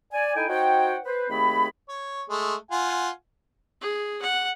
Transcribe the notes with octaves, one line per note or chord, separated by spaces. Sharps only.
D5 G#5
D#4 E4 A4 G5 G#5
D#4 F#4 C5 C#5 F#5 G5
B4 C5
D#2 A3 C4 G#4 B5
C#5
G#3 A3
F4 F#5 G#5
G#4
F#5